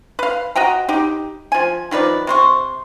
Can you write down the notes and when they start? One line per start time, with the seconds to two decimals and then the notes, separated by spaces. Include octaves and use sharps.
0.19 B4 F5
0.56 F#4 D#5 G5 A#5
0.89 D#4 G4
1.52 F3 G#5
1.91 D#3 F3 B4 D5
2.27 C3 C5 C#6